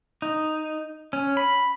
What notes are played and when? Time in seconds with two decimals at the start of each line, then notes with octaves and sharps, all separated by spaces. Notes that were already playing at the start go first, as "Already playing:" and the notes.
0.22 D#4
1.13 C#4
1.37 B5